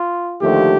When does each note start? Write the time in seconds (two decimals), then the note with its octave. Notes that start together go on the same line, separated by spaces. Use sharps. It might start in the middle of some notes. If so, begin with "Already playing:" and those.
Already playing: F4
0.40 D#2 D3 F3 A3 G4